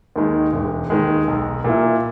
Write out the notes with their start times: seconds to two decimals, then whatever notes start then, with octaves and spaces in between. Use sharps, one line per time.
0.16 D#2 D#3 G#3
0.53 E1
0.90 D#2 D#3 G#3
1.28 B1
1.64 A#2 A#3 E4